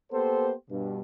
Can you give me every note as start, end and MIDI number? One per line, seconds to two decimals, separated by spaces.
0.13 0.53 58
0.13 0.53 59
0.13 0.53 67
0.13 0.53 69
0.13 0.53 72
0.71 1.01 43
0.71 1.01 47